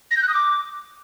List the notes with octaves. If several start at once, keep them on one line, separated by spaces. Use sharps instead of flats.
A#6
G6
F#6
D#6
D6